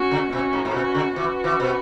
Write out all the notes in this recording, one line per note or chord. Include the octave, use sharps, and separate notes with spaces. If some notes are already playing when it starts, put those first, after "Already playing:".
Already playing: C#4 F#4
C#3
B2 C#4 F#4
G#2
G#2
B2 C#4 F#4
C#3
E3 C#4 F#4
E3
B2